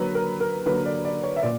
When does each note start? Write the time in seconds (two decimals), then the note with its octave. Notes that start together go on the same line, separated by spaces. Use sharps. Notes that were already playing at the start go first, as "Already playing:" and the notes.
Already playing: D3 F#3 A#3 B4
0.15 A#4
0.40 A#4
0.66 D3 F#3 A#3 B4
0.86 D5
1.05 D5
1.24 C#5
1.36 E5
1.43 A#2 D5